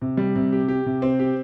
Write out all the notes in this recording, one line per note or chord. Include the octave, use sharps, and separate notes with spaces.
C3
G3
C3
G4
G4
C3
C4
G4